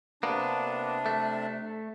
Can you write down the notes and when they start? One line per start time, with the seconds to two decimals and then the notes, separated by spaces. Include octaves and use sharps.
0.23 C3 A#3 B3 D4
1.06 A3